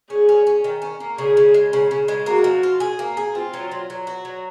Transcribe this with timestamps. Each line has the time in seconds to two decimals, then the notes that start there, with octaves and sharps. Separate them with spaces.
0.10 C#4 G#4
0.29 C#4
0.47 C#4
0.64 D#3
0.82 C#4
1.00 A#3
1.18 C#3 G#4
1.37 C#3
1.54 G#3
1.73 C#3
1.91 C#3
2.08 G#3
2.26 A#3 F#4
2.44 F3
2.63 F4
2.80 G#4
2.99 A#3
3.17 G#4
3.35 C4 F4
3.53 F#3
3.71 F#3
3.90 F#3
4.07 F#4
4.25 F#3